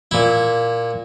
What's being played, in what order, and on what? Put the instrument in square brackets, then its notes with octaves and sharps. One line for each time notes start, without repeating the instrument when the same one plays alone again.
[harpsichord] A#2 E4